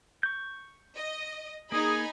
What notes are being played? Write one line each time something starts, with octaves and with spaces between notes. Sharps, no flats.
C#6 G6
D#5
A#3 D#4 G#4 G#5 B5